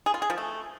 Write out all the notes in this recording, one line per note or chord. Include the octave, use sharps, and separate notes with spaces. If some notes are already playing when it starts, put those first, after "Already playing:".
G#4
F4
G#4
F3
A3